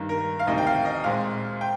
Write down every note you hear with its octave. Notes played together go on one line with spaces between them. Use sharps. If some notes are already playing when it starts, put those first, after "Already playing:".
Already playing: G2 D#3 A#3
A#4
F5
D2 C3 D#3 A#3 D#5
G5
F5
D#5
A#2 G#3 C4 F5
G5